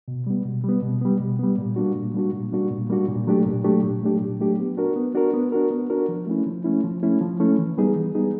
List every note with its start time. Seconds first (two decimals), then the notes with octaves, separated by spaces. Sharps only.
0.08 B2
0.26 G3 B3
0.45 B2
0.64 G3 B3
0.82 B2
1.01 G3 B3
1.20 B2
1.39 G3 B3
1.58 A#2
1.76 G3 A#3 D4 F#4
1.95 A#2
2.14 G3 A#3 D4 F#4
2.33 A#2
2.52 G3 A#3 D4 F#4
2.71 A#2
2.89 G3 A#3 D4 F#4
3.08 A#2
3.27 F#3 A3 D4 G4
3.46 A#2
3.64 F#3 A3 D4 G4
3.83 A#2
4.02 F#3 A3 D4 G4
4.21 A#2
4.40 F#3 A3 D4 G4
4.59 B3
4.77 D4 F#4 A#4
4.96 B3
5.15 D4 F#4 A#4
5.33 B3
5.52 D4 F#4 A#4
5.71 B3
5.90 D4 F#4 A#4
6.09 F3
6.27 A3 C#4 E4
6.46 F3
6.64 A3 C#4 E4
6.84 F3
7.02 A3 C#4 E4
7.21 F3
7.40 A3 C#4 E4
7.58 E3
7.78 G3 B3 D#4 G#4
7.96 E3
8.15 G3 B3 D#4 G#4